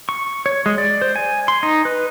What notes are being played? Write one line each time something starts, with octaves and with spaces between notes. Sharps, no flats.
C#6
C#5
G#3
D5
C5
G#5
C6
D#4
B4